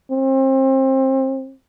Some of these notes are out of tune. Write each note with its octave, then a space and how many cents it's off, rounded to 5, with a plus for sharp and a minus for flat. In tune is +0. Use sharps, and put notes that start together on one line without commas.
C4 +30